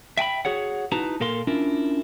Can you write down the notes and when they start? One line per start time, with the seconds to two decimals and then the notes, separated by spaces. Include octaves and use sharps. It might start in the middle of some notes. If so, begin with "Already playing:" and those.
0.17 E5 G5 G#5 B5
0.45 F#4 G#4 C#5 F#5
0.92 D#4 E4 F#4 B4 A5 A#5
1.20 A#2 A4 A#4 F5 C6
1.47 C#4 D4 E4 F4 A#4